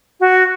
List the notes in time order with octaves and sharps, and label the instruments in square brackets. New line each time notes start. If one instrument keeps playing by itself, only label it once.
[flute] F#4